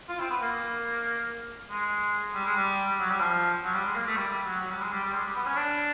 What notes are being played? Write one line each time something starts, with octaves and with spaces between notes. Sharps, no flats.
F4
C4
B3
A#3
G#3
G3
G#3
G3
F#3
G3
F3
F#3
G3
G#3
A#3
A3
G3
G3
F#3
F#3
G3
G#3
G3
G3
G#3
G3
B3
C#4
D4